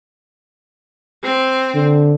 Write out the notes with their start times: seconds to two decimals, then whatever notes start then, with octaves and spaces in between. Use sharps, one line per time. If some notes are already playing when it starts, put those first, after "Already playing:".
1.24 C4
1.75 D3